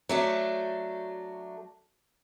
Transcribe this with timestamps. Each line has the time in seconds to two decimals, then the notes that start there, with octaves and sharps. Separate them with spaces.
0.09 F#3 A3 D4